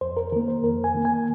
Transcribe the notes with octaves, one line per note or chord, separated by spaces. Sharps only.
F2 C5
A#4
D#3 A#3 A#4
C5
F2 A#4
G#5
D#3 A#3
G#5